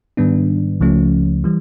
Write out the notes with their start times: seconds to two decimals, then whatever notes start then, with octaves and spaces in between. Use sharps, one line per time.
0.17 G#2 D#3 G3 B3 D4
0.80 C#2 C#3 F3 A3 C#4
1.44 E3 G3